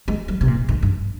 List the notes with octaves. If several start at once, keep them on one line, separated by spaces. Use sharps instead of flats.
G#3
G3
C3
A#2
G#2
G2